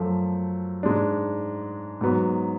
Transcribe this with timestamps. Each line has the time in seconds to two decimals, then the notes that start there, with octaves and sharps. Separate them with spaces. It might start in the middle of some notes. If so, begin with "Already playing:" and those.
Already playing: F#2 F3 A3
0.83 G#2 G#3 D4
2.01 G#2 F#3 B3